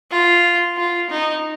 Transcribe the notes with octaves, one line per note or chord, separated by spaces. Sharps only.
F4
F4
D#4